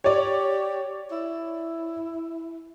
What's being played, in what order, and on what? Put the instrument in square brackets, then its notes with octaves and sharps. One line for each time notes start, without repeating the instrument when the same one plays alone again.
[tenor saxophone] G4 [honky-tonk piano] C#5 D5
[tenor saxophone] E4